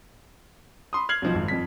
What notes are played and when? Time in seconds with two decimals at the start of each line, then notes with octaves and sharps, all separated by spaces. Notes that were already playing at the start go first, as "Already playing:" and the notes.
0.93 B5 C6 D#6
1.09 F6 G#6 C7 F#7
1.22 B1 F3
1.35 G#1
1.48 F2 B6